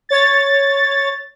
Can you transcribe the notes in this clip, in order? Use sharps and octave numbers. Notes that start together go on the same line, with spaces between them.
C#5 A6